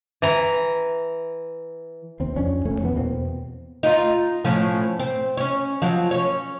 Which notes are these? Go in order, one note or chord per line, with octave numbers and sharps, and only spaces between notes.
E3 A#5
D#2 C4
F2 C#4 D4
E1 A3 C#4
F2 E3 B3
E2 B2 A#3 C4
D#4 F4
A2 F3 C#4
C4
C#4 C#5
F3 F#3
C#4 C#5